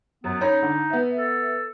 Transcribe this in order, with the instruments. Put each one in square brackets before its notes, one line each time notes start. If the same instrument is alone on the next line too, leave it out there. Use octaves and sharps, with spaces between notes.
[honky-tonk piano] F#2 [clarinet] B3
[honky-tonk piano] C#4 A#5 B5 [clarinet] D#4
[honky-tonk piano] D3
B3 E5
[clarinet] A4